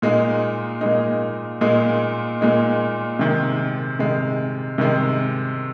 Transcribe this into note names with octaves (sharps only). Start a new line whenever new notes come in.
A#2 G#3 D#4
A#2 G#3 D#4
A#2 G#3 D#4
A#2 G#3 D#4
C3 D#3 G#3
C3 D#3 G#3
C3 D#3 G#3